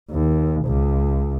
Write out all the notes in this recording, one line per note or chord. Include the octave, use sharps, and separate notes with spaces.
D#2
C#2